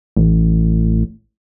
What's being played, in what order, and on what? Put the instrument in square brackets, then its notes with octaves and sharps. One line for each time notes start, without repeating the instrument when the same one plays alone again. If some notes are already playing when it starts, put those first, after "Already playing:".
[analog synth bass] A1